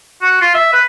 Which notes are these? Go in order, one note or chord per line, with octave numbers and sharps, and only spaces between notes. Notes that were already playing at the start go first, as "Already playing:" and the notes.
F#4
F4
E5
B4